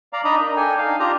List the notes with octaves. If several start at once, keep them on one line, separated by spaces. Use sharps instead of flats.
D5 F5 A#5
D4 D#4 D#5 A#5 B5
A#4
D4 A4 G5 G#5
D#4 F5
D4 F4 G4 A#5